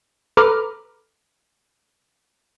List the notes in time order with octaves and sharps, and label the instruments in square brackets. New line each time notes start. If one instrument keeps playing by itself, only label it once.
[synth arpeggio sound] A4 B4 A#5 B5 D6 F6